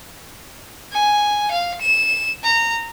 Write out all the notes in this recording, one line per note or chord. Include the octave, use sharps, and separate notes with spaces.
G#5
F5
E7
A#5